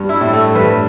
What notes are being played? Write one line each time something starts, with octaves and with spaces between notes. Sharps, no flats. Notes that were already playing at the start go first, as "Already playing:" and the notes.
Already playing: G2
E4
A2
A3
G2 B4